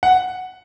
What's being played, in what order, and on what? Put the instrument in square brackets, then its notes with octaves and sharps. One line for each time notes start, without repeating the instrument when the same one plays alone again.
[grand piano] F#5